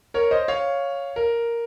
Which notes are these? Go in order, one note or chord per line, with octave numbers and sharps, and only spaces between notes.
A#4 C#5
C5 D#5
C#5 F5
A#4